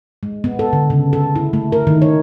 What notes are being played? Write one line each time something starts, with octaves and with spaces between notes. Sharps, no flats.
G#3
B3
A4
D3
C#3
A4
E4
A3
A#4
D#3
C#5